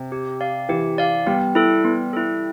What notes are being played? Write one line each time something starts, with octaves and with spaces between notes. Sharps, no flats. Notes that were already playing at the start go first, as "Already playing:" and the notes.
Already playing: C3
G4
D5 F5
E3 G4
D5 F5
G3 B3
E4 A4
B3
E4 A4